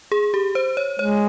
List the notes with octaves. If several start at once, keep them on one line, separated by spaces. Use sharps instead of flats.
G#4
G4
C5
C#5
G#3 C#5